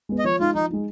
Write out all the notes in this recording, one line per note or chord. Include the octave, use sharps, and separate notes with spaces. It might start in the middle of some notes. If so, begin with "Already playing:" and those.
G#3 B3
D#5
F3 C#5
G#3 D#4 F4
F3 D#4
G#3 D#4